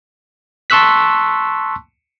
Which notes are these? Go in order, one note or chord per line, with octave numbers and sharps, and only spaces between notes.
A5 C6 C#6 E6 F#6 B6